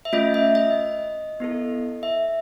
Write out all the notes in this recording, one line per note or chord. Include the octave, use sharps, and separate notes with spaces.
E5
A3 C#4 F4 D#5
E5
D#5
B3 E4 A4
E5